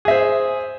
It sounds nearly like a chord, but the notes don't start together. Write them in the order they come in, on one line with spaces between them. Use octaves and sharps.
G#4 E5 C5